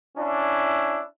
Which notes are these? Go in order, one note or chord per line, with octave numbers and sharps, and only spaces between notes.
C#4 D4 E4